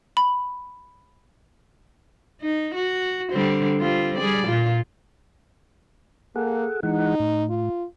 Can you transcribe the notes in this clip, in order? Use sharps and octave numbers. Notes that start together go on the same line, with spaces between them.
B5
D#4
F#4
D3 G3 C4
G3 C4 F4
G3 G#4 D5
A#2 F4
A#3 G#4 A4 F#5
E3 G#3 D#4 F#5
A2
F4